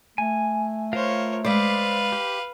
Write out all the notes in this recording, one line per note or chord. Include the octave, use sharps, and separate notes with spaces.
A3 G#5
F4 A#4 C5 C#5 F5
G#3 B4 C5 D5 E5 F5
G4